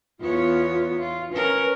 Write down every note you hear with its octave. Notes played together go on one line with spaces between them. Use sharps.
E2 B3 F4 C#5
F4
C#4 A#4 B4